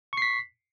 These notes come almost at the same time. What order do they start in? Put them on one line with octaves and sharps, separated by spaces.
C#6 C7 B6